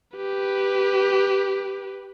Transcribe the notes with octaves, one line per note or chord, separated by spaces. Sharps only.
G4 B4